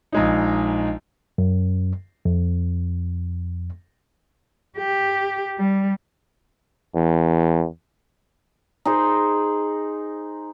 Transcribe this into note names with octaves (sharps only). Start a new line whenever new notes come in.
A#1 G#3 D#4
F#2
F2
G4
G3
E2
D#4 G#4 C5